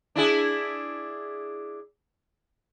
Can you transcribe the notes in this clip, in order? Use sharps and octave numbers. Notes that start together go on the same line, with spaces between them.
D4 E4 G#4